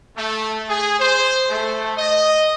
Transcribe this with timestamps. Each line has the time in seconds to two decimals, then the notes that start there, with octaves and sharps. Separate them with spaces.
0.17 A3
0.69 G#4
1.00 C5
1.50 A3
1.97 D#5